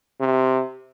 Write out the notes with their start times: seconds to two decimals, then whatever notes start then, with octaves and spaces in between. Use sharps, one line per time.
0.20 C3